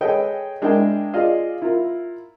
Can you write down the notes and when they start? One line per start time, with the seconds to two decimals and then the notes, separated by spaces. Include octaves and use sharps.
0.01 G#4 A4 B4 C#5 D#5 G5
0.62 G#3 D4 E4 A#4 G5
1.13 F4 G#4 D5 D#5 F5
1.62 E4 F4 A#4